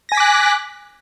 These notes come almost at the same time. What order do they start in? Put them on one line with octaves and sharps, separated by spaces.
A#6 G#5 B6 D6 F#6